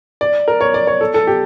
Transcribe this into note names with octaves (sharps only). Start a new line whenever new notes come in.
D5
A#4
C#5
D5
C#5
A4
A4
G4